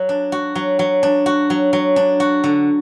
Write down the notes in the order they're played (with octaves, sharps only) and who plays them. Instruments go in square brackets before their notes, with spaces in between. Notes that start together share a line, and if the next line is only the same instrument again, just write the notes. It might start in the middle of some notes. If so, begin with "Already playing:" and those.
Already playing: [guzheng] F#3
D4
F#4
F#3
F#3
D4
F#4
F#3
F#3
D4
F#4
D3